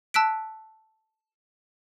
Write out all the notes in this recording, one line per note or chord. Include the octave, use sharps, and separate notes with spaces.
A5 E6 F#6 B6 D7